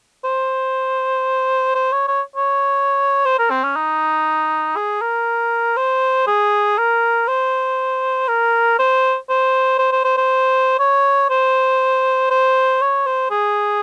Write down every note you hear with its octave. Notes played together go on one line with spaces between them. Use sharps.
C5
C5
C#5
C#5
C#5
C5
A#4
C4
C#4
D#4
G#4
A#4
C5
G#4
A#4
C5
A#4
C5
C5
C5
C5
C5
C5
C#5
C5
C5
C#5
C5
G#4